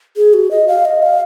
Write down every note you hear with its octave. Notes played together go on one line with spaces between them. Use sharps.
G#4
F#4
D#5
F5
D#5
F5